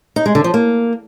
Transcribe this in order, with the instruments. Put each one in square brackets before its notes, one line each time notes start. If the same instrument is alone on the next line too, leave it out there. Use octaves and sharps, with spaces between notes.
[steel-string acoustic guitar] D#4
G#3
D3
F3
A#3